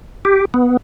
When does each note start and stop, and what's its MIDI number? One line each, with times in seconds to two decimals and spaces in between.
0.25 0.45 67
0.54 0.77 59